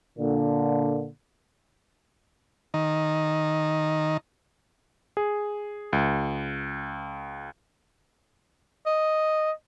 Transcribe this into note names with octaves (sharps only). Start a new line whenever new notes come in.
A#2 D3
D#3
G#4
C#2
D#5